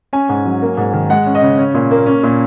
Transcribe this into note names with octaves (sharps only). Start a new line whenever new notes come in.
C#4 G#5
G#2
F#3
A#3
G#2
D#3
G#3 F#5
C#4
D#5
C#3
C#4
A#2
A#3
C#4
A#2